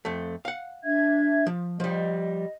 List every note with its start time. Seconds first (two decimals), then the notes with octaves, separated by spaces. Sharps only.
0.05 F2 A3
0.45 F5 F#5
0.84 D4 E5 G#6
1.46 F3
1.80 F3 G3 D#5